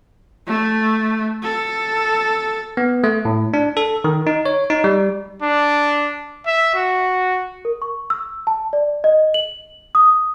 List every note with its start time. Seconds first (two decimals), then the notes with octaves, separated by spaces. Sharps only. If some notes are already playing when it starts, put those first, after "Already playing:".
0.47 A3
1.42 A4
2.77 B3
3.04 A3
3.25 A2
3.54 D4
3.77 A4
4.04 D#3
4.27 D#4
4.46 C#5
4.70 D#4
4.84 G3
5.42 D4
6.46 E5
6.75 F#4
7.65 A#4
7.82 C#6
8.10 E6
8.47 A5
8.73 D5
9.04 D#5
9.34 F#7
9.95 D#6